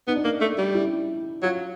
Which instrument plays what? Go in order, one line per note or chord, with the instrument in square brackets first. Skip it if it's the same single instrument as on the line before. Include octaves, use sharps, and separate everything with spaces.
[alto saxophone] B3 [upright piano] D#4
[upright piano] D4
[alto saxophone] A#3 [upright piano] D#4
[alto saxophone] A3
G3
[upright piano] E4
[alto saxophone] F#3 [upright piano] F4